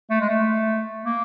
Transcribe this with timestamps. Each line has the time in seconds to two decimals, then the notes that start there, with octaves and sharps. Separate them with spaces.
0.10 A3
0.21 G#3
0.29 A3
1.05 A#3